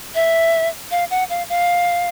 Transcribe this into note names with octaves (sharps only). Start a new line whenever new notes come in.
E5
F5
F#5
F5
F5